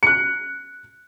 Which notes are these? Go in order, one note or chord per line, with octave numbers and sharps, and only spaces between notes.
F#6 C#7